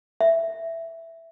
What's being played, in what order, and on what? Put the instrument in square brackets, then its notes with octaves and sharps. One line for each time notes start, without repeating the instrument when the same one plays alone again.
[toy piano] E5